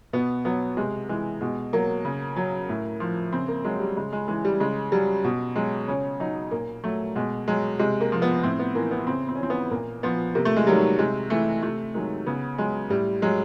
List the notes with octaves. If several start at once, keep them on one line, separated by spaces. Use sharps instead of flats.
B2 B3
F#3 B3
C3 G#3
E3 G#3
B2 G#3
F#3 A#3
C#3
F#3
A2
F3
C#3 C4
A#3
F#3 G#3
G3
C#3 G#3
G#3
E3 G#3
G3
C#3 G#3
F#3 G3
B2
F#3 G#3
C#3 C#4
F#3 D#4
A#2 A#3
F#3 A3
B2 G#3
F#3 G#3
C3 G#3
A#3
F3
B3
A2 C4
B3
E3 A#3
B3
C#3 C4
C4
C#4
E3 C4
B3
A#2 A#3
F3 B3
C3 A#3
A3
G#3
D#3 F#3 G3
C3 G#3
E3 A3
C3 A3
D#3 F#3 G#3
C#3 B3
F#3 G#3
A2 G3
F#3 G#3